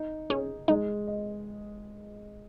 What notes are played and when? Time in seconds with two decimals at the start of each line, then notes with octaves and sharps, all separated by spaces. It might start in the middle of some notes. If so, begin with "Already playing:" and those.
Already playing: D#4
0.30 C#4 G#4
0.68 G#3 D#4
1.07 D#5